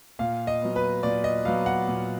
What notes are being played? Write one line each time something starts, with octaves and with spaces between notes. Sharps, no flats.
A#2 F5
D#5
F#3 B3
B4
A#2 D5
D#5
F#3 B3 F5
F#5
A#2